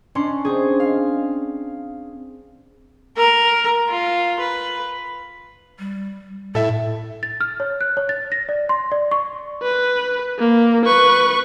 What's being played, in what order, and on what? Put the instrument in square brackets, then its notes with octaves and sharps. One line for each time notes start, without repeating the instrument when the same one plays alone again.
[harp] C#4 D4 C6
C4 G#4
F5
[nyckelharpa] A#4
F4
B4
[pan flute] G3
[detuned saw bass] A2 [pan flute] E4 [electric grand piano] A4 E5
[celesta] A6
F6
C#5
F#6
C#5
A6
A#6
D5
C6
D5
C#6
[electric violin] B4
A#3
B4 C#6